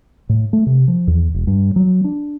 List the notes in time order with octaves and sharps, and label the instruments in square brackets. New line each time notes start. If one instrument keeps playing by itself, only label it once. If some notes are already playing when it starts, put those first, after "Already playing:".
[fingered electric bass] A2
A3
C3
F3
E2
E1
G2
F#3
D4